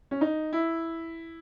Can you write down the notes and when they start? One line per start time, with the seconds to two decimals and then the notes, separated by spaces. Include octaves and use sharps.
0.11 C#4
0.21 D#4
0.53 E4